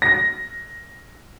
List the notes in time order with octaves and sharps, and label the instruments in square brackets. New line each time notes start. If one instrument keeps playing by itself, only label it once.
[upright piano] A#6